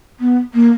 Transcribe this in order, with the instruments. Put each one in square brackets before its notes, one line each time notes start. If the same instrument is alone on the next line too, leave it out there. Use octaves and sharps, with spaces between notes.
[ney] B3
A#3